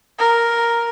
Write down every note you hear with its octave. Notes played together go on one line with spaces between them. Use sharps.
A#4